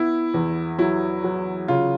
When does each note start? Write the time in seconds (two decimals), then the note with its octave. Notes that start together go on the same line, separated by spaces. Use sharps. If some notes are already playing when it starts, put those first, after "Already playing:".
Already playing: B3 E4
0.34 E2
0.78 F#3 E4
1.24 F#3
1.68 C#3 F4